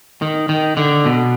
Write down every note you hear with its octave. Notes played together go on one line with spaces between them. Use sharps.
D#3
D#3
D3
B2